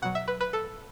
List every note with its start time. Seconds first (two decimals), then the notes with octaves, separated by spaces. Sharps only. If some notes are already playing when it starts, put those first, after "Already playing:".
0.02 B2 F#3 F#5
0.15 E5
0.28 B4
0.41 B4
0.53 A4